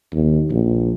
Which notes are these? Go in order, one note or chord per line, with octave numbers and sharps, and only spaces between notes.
D#2
A#1